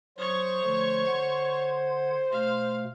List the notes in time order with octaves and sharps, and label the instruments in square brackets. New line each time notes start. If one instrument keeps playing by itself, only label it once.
[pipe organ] F#3 D#6 [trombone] C5 [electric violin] C#5 C#6
[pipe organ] D3 F3 A3
D3 F#5 G#6
[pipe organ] B2 A3 [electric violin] F5